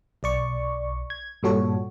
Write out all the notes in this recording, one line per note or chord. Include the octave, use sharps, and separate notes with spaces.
B1 D5 C#6
G#6
G2 A#2 G3 F#4 A4 C#5